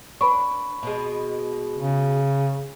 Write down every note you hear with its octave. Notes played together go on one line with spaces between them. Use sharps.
D4 B4 B5 C#6
B2 G#3
C#3